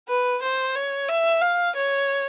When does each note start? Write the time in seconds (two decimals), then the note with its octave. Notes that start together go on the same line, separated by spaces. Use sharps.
0.08 B4
0.42 C5
0.75 C#5
1.09 E5
1.42 F5
1.76 C#5